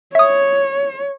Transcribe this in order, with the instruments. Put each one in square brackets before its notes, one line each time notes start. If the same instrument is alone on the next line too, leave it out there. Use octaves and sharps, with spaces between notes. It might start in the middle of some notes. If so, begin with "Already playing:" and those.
[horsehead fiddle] C#5 [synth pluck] E5 D#6